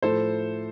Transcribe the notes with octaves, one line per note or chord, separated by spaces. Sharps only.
A2 F3 A4 C5